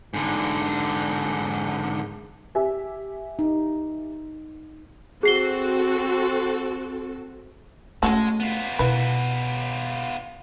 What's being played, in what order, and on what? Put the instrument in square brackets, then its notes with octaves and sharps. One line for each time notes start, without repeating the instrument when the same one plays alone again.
[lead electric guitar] G#2 D3
[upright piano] G4 E5 G#5
[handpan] D#4
[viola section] C4 F#4 A4 [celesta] G#4 C7 G7
[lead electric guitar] G#3 [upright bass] A3 [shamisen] C#4 F#4 A4
[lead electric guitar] B3 F4
[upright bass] B2 [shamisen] E4 B4